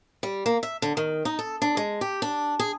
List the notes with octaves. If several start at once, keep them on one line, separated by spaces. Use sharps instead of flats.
G3
A#3
E5
D3
D#3
D#4
A4
D4
G#3
G4
D4
G#4